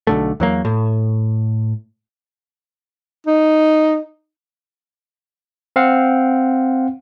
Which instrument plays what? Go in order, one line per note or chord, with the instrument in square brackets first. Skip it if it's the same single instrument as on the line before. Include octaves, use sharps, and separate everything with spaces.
[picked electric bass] B1 D3 A3
E2 F#3 A#3
A2
[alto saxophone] D#4
[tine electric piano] C4 F5 F#5